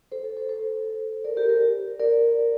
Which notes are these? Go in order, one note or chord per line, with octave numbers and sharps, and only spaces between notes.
A4 C5
A4 C5
A4 C5
A4 C5
A#4 D5
G4 A#4
G4 A#4
A#4 D5